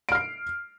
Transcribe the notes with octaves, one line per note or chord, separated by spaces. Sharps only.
F6 C7 D7